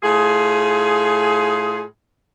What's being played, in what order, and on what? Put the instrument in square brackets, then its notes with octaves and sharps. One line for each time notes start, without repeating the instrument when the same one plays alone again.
[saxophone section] A2 F4 G#4